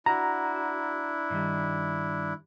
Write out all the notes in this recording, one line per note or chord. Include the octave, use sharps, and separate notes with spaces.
D4 E4 F#4 A#5
G2 D#3 G3